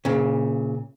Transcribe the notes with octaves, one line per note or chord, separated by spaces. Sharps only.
A#2 C#3